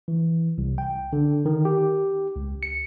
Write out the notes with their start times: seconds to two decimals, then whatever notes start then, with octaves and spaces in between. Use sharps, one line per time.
0.08 E3
0.58 C2
0.78 G5
1.13 D3
1.45 D#3
1.65 G4
2.36 C#2
2.63 C#7